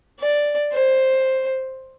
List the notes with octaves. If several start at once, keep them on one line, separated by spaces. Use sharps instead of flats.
D5
C5